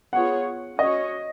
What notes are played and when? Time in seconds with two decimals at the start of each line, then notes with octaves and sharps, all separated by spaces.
0.13 B3 F4 G#4 C#5 F#5
0.79 C#4 F#4 C#5 D#5